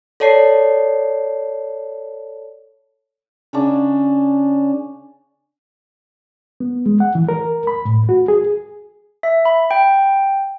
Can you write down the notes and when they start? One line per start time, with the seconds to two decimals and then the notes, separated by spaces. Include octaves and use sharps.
0.20 A4 C#5 D5 A5 C7
3.53 C#3 C#4 D4
6.60 B3
6.86 G#3
7.00 F#5
7.15 E3
7.29 A#4
7.67 B5
7.85 A2
8.09 F#4
8.28 G#4
9.23 E5
9.46 B5
9.71 G5